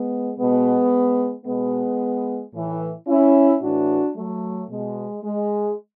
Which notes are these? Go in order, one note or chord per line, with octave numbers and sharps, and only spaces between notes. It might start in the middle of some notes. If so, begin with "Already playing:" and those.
Already playing: G#3 B3
B2 G#3 B3
B2 G#3 B3
A2 E3
C#4 E4
A2 E3 D4 F#4
F#3 A3
B2 G#3
G#3